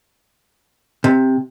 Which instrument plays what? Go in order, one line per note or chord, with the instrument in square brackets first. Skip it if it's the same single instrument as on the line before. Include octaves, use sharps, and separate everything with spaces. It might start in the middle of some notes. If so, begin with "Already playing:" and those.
[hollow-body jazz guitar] C3